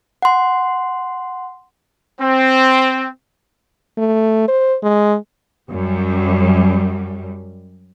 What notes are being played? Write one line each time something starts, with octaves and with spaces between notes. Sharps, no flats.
F#5 C6
C4
A3
C5
G#3
F#2 G3